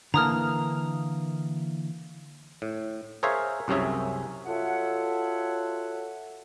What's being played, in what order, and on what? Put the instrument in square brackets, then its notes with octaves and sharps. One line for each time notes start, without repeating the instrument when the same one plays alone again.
[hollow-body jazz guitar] D3 E3 A#3 [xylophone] A#5 D#6 F6
[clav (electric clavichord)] A2
G#4 A#4 C5 C#5 E5 F5
C2 F#2 C3 C#4 G#4 E5
[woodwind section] F4 F#4 A4 C#5 E5 F#5